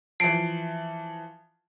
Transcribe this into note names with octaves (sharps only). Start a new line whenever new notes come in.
E3 F3 C7 D7